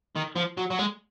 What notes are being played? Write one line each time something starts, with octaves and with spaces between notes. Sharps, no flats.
D#3
F3
F#3
F#3
G#3